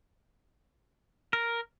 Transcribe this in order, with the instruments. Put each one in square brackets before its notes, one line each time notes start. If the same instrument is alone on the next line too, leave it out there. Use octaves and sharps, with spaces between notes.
[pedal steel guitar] A#4